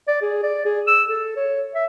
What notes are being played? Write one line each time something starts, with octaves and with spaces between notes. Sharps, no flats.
D5
G#4
D5
G#4
E6
A4
C#5
E5